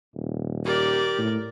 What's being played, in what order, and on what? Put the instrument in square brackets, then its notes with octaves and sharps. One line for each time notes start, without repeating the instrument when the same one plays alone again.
[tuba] D#1
[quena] G4 [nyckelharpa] A#4 D5
[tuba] A2